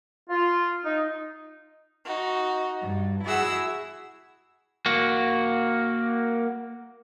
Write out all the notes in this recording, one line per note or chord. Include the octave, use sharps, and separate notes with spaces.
F4
D#4
D#4 F#4
G2
E4 F#4 G#4 E5 F#5 E6
A#3 F#4